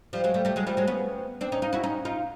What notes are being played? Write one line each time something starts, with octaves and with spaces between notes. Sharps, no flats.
F3 G3
F#3 G#3
G3 A3
G3 A3
F#3 G#3
F3 G3
F#3 G#3
B3 C#4
C4 D4
C#4 D#4
D#4 F4
E4 F#4
C#4 D#4
D#4 F4